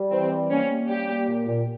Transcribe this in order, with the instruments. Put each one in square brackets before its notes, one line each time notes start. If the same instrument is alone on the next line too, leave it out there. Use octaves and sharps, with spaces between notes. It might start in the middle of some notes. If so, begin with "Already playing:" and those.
Already playing: [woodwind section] G3
[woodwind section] E3 [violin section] C4
[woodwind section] G3
[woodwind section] A#3 [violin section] C#4
[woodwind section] A#3
[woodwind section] G3 [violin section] G4
[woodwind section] A#3
A#2
A#2